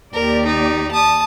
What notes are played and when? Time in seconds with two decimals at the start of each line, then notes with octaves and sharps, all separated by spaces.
0.13 D#2 G4 A#4 D5
0.46 D#4
0.91 A5 D#6